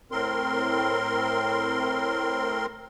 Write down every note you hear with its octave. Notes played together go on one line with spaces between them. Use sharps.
A2 C4 A#4 C6